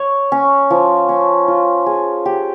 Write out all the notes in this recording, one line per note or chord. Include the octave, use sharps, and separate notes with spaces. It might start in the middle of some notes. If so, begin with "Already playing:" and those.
Already playing: C#5
C#4
F3
C#4
F4
G#4
G4